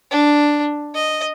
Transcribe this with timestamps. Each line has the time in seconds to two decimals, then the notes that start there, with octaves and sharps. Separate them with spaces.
0.11 D4
0.95 D#5